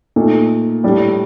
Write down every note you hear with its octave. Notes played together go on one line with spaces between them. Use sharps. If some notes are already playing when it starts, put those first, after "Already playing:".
A#2 A3 D#4
A2 G3 D4